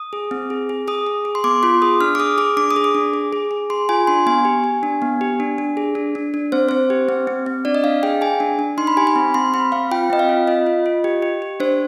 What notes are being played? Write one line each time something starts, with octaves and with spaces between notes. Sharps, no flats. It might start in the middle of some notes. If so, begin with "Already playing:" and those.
Already playing: D#6
G#4
C4
G#4
G#4
G#4 D#6
G#4
G#4
C6
B3 D6
F4 C6
G#4 D#6
D4 F6
D6
G#4 D#6
G#4 D6
D4 D6
D#6
G#4
D6
D4
G#4
G#4
G#4
G#4 C6
F4 G#5
D4 C6
B3 G#5
G4
G4
D4
B3
G4
D4
D4
G#4
D4
D4
D4
C4 C5
C4 C5
G4
C4
C4
C4
D4 D5
D#5
D4 F5
G#4 G5
G#4 G#5
D4
D4
D#4 C6
B5
G4 G#5
B5
C4
C4 C6
C4 B5
C4 F5
F4 G5
C4 D#5
F5
F4
F4 D#5
F4
F4
G4
G4
G4
D4 C5